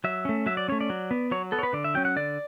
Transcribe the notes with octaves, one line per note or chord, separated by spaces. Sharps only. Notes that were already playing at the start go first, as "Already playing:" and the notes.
F#3 E5
A3 C#4
F#3 E5
D5
A3 C#4 C#5
D5
F#3
B3
F#3 C#5
B3 A4
C#5
B4
D3 D5
E5
F#3 C#4 G5
F#5
D3 D5